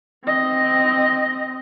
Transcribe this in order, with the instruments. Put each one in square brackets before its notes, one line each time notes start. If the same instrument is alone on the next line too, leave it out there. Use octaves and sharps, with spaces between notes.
[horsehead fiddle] C4 D#5